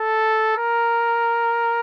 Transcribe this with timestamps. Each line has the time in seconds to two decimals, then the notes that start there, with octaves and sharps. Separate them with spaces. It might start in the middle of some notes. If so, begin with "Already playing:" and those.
Already playing: A4
0.57 A#4